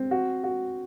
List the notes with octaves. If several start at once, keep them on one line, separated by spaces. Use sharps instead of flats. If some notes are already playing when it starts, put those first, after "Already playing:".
Already playing: C4
F#4
F#4